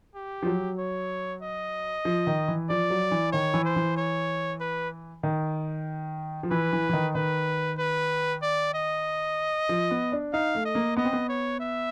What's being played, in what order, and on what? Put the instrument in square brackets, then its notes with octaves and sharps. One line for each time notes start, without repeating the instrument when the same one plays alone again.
[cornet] G4
[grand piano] F3
F#3
[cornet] C#5
D#5
[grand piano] F3
D#3
E3
[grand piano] F3 [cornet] D5
[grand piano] F#3
E3
[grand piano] D#3 [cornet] C#5
[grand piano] E3
[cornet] C5
[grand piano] E3
[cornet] C#5
B4
[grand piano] D#3
F3
[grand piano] E3 [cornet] B4
[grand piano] E3
E3
D#3
[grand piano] D#3 [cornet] B4
[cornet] B4
D5
D#5
[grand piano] F3
B3
D4
[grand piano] D#4 [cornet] F5
[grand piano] A3
[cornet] D#5
[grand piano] A#3
[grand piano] B3 [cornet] D#5
[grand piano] C4
B3
[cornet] C#5
E5